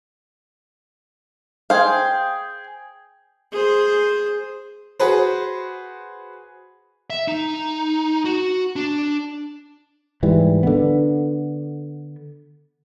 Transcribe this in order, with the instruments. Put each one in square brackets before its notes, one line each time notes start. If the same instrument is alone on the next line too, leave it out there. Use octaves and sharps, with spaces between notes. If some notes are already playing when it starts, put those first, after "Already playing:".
[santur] G#4 G5 G#5 [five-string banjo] C5 F5
[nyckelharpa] G#4 C5
[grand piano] F#4 G#4 B4 C5
[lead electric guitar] E5
D#4
F#4
D4
[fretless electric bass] G#2 E3 G3
D3 B3